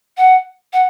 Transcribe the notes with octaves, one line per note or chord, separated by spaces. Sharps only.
F#5
F#5